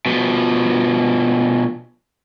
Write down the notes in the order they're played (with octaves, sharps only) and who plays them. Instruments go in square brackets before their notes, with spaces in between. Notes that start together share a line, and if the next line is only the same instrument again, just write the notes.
[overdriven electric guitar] B2 F3